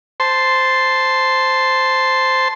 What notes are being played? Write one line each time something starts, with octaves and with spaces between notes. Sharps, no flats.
C5 A5 C6